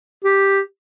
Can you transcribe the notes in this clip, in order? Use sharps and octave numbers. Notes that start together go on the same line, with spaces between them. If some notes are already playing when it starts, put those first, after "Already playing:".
G4